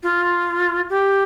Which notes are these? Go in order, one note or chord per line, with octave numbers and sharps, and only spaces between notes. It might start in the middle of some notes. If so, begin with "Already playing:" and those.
F4
G4